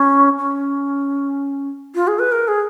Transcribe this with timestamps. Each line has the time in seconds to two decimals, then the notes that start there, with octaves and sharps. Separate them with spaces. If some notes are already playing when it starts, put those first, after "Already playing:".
Already playing: C#4
0.38 C#4
1.95 F4
2.07 G#4
2.19 B4
2.32 A#4
2.48 G#4